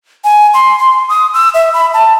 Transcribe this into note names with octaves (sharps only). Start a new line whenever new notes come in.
G#5
C6
C6
D#6
E6
E5
B5
A5